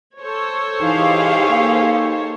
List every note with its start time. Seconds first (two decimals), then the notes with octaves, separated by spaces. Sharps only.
0.19 A4 C5 C#5
0.81 E3 D#4 G4 G#4 F5
1.49 A#3 D#4